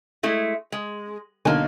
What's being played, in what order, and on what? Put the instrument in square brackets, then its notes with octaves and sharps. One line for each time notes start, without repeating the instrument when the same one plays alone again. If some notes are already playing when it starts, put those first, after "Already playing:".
[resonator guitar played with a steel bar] G#3 A3 E4
G#3
[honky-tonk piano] B1 D3 D#4 [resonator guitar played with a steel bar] A#3 G#5